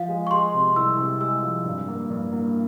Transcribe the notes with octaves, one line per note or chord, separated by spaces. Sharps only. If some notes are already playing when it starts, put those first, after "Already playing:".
Already playing: F3 F5
G#3
C#6
G#3 C6
C3
C2 E6
C3
G#3 E6
F3
G2
A#3
G2
A#3